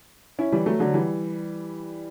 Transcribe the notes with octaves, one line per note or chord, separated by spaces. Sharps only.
C#4 E4
E3 G3
F#3 A3
D3 F#3
E3 G3